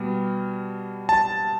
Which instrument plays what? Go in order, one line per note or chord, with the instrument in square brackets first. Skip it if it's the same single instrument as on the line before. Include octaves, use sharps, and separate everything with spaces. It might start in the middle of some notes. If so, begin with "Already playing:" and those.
Already playing: [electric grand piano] B2 G3
A5